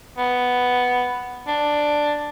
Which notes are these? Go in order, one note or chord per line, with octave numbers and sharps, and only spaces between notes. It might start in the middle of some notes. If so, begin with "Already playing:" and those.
B3
D4